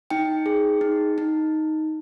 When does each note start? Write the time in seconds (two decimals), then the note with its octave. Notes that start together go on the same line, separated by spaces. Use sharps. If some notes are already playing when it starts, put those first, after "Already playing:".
0.10 D#4 G5
0.46 G#4
0.81 D#4
1.18 D#4